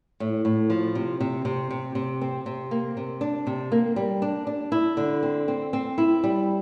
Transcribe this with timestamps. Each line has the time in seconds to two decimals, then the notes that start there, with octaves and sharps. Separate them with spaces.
0.20 A2
0.45 A2
0.70 F3
0.95 C3
1.20 C3
1.45 C3
1.71 C3
1.95 C3
2.21 C4
2.46 C3
2.71 A#3
2.97 C3
3.21 D4
3.47 C3
3.72 A#3
3.96 G3
4.22 D4
4.47 D4
4.72 E4
4.97 D3
5.23 C4
5.48 C4
5.73 C4
5.98 E4
6.24 G3